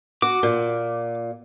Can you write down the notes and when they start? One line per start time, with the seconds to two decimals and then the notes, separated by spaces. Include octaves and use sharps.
0.22 F#4 D6
0.43 A#2